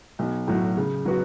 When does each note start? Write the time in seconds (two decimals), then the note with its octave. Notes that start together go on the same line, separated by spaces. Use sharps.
0.19 B1
0.48 A2 F#3
0.77 C#3
1.05 F#3 B3 F#4